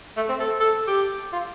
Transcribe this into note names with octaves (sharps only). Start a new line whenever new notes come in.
A3
C4
A4
A4
G4
F4